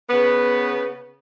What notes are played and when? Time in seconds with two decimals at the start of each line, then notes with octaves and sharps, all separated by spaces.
0.09 C#3 B3